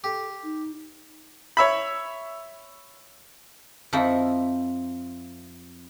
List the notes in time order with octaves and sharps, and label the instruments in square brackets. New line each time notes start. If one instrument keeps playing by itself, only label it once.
[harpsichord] G4 [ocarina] A4
[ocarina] D#4
[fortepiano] C#5 E5 B5
[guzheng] F2 F3 D#4 E4